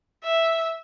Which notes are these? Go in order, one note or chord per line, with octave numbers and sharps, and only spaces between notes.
E5